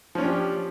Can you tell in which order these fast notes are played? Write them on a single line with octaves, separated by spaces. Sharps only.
F3 C#4 D4 G4